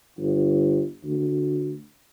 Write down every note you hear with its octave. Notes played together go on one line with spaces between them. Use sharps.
G1
D2